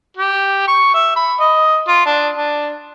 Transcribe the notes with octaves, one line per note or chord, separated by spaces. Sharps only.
G4
C#6
E5
B5
D#5
F4
D4
D4